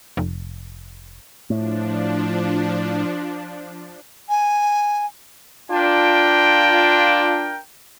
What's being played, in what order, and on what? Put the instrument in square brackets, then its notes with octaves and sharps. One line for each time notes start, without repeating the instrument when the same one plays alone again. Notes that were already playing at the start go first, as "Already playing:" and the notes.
[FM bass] F1
[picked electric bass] A2 [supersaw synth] F3 D4
[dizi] G#5
[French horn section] D4 F4 [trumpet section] A#4 G5